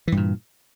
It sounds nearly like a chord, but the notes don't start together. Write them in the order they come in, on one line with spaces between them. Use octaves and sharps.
E3 G2 A#2